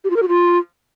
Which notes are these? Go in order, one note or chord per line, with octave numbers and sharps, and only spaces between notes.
G4
F4
A#4
F#4
F4